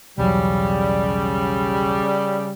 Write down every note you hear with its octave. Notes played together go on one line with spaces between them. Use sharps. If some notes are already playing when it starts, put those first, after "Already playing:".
B1 E2 C#3 F#3 G3